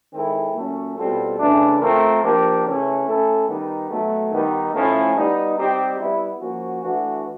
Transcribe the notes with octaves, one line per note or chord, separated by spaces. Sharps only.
D#3 G#3 C4 E4 A4
A#2 F#3 A3 C#4
B2 G3 C4 F4 A4
C#3 E3 A3 D4
A3 C4 F4 A#4
F3 A#3 D4 G4 A#4
C#3 E3 A3 C#4
A3 C#4 E4 A4
D#3 G3 B3 D#4
B2 F#3 A3
D#3 G3 B3 D#4
A2 F3 A3 C#4 E4
G3 B3 D#4
G3 C4 D#4 G4
G3 B3 E4
F3 A#3 C#4 F#4
E3 A3 D4 F#4